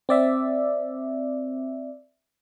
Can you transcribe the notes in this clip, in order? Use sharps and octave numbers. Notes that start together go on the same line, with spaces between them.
C4 D5 E5